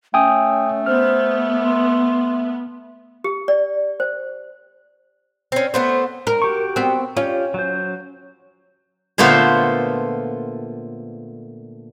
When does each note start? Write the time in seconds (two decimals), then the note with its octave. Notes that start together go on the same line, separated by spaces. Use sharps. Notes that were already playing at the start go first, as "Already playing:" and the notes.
0.14 A3 C#4 G5 G#5 D#6
0.86 B3 C5 F6
1.64 C6
3.24 G4
3.48 D5
4.00 C5
5.52 C4 C#4
5.74 A3 B3 C5
6.27 A#4
6.42 F#4 G4 C#6
6.76 B3 C4
7.17 C#4 F4 G4
7.54 F#3 C5
9.18 A#2 D3 A3 B3 F4 C5